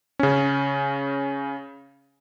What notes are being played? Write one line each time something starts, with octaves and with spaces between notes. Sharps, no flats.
C#3 C#4